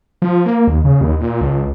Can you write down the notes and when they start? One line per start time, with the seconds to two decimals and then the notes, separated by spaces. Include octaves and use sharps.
0.22 F3
0.46 A#3
0.68 D#2
0.85 C#3
1.01 D#2
1.21 A#2
1.41 C#2